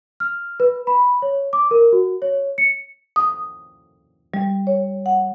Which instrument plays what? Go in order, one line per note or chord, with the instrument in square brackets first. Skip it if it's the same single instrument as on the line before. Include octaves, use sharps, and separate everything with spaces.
[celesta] F6
B4
B5
C#5
D6
A#4
F#4
C#5
C#7
[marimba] D#6
G3
C#5
F#5